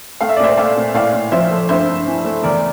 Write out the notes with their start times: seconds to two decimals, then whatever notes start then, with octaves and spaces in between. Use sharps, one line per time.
0.21 A3 F5
0.29 E5
0.36 D5
0.39 A#2 C5 E5
0.57 A3 D5 F5
0.76 A#2
0.94 A2 D5 F5
1.13 A2
1.32 F3 C5 E5
1.51 A3
1.69 G2 C5 E5
1.88 G2
2.07 E3
2.24 A3
2.43 E2 A#4 D5